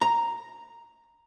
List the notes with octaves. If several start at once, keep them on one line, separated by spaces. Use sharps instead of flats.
A#5